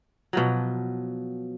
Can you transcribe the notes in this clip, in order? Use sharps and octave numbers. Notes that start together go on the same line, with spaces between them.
B2 F3 F#3